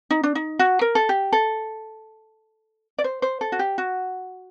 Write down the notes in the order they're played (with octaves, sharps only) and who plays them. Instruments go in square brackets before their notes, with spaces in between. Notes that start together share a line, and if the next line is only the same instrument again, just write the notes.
[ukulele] D#4
D4
D#4
F#4
A#4
A4
G4
A4
D5
C5
C5
A4
F#4
G4
F#4